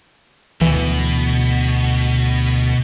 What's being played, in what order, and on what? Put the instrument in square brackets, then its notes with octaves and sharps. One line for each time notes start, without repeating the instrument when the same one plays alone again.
[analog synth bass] D2 [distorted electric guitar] B2 [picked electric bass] E3